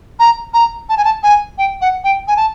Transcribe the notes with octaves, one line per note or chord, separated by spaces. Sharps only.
A#5
A#5
A5
G#5
A5
G#5
G5
F#5
G5
G#5
A5